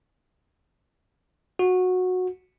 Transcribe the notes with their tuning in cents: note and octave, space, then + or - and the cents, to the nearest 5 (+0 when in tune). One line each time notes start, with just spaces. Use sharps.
F#4 -15